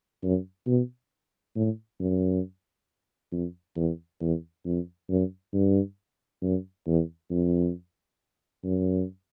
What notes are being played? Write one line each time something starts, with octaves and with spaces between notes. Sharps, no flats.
F#2
B2
A2
F#2
F2
E2
E2
F2
F#2
G2
F#2
E2
F2
F#2